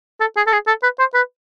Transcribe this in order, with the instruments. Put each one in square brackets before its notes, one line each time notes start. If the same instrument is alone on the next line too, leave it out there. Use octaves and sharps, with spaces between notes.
[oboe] A4
G#4
A4
G#4
A4
B4
C5
B4